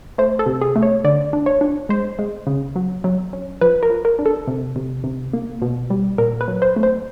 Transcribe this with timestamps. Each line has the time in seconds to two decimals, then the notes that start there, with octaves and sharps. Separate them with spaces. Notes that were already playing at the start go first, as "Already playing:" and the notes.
0.18 A3 C5
0.39 A4
0.46 C3
0.62 G#4
0.76 A3
0.83 C#5
1.04 D3 D5
1.33 D4
1.46 C#5
1.61 D4
1.89 G#3 C5
2.19 G#3
2.47 C#3
2.76 F#3
3.04 F#3
3.33 C#4
3.61 F3 B4
3.83 A#4
3.90 F3
4.05 A#4
4.19 D4
4.26 A4
4.47 C3
4.76 C3
5.04 C3
5.33 A#3
5.62 B2
5.90 G3
6.18 A#2 A#4
6.41 B4
6.48 F#3
6.62 C5
6.76 A3
6.83 C5